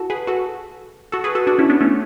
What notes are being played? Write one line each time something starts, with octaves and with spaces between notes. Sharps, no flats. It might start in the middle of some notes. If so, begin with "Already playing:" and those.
Already playing: E4 F#4 A4
G#4 B4
F#4 A4
F#4 A4
G#4 B4
F#4 A4
D4 F#4
C#4 E4
B3 D4
A3 C#4